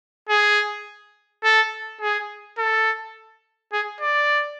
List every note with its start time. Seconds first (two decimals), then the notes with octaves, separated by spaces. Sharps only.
0.29 G#4
1.44 A4
2.01 G#4
2.58 A4
3.73 G#4
4.01 D5